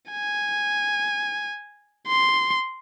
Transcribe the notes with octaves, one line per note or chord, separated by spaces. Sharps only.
G#5
C6